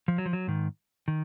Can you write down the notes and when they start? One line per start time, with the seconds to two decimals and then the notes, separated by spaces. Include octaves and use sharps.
0.08 F3
0.18 F#3
0.26 F3
0.33 F#3
0.47 G#2 D#3
1.08 D#3